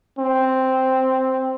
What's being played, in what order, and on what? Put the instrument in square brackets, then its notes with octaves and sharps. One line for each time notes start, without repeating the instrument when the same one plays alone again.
[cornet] C4